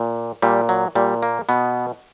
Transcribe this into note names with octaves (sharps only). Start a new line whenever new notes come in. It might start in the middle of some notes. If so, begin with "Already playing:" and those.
Already playing: A#2
A#2 G3
F#3
A#2 G3
A#3
B2 B3